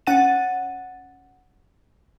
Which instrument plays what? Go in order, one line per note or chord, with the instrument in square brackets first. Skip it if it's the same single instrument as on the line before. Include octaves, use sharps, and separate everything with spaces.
[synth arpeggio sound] C#4 F#5 A6 D#7